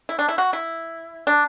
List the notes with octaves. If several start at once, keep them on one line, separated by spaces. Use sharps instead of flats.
E4
D4
E4
F#4
E4
D4